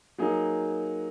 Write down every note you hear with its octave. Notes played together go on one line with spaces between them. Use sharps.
F#3 A#3 D#4 G#4